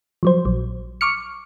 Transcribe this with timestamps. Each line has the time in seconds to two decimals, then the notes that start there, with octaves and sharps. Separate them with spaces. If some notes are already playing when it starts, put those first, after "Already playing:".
0.23 F3 F#3 C5
0.45 A#1 F#3
1.01 C#6 D6 F6 C#7